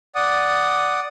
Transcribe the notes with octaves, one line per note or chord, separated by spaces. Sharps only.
D5 F#5 D#6